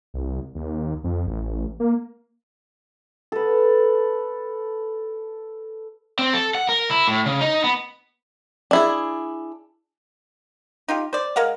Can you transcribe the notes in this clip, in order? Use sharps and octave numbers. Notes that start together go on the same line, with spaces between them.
C2
D#2
F2
A1
A#3
A4 B4
C4
A4
F#5
A#4
E4
A2
C#3
D#4
B3
D4 E4 G#4
D#4 F4 G4
C5 D5
G#3 A#4 F5 F#5